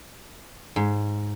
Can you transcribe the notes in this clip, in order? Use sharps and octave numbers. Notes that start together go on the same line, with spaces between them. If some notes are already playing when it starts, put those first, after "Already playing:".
G#2